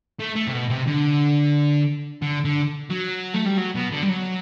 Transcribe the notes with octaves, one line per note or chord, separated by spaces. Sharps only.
A3
A3
C3
B2
C3
D3
D3
D3
F#3
A3
G3
F#3
B2
D3
G3
F#3